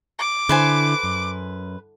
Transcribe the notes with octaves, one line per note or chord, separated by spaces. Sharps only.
D6
D3 E4 B4 C5 G#5
F#2